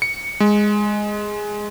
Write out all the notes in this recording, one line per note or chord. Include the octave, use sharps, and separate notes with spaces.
C#7
G#3